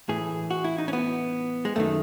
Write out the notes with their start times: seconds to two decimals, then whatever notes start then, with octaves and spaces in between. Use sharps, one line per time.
0.09 A2 E3 G#4
0.51 F#4
0.64 E4
0.78 D#4
0.88 C#4
0.93 B3
1.65 G#3
1.76 F#2 D#3 A3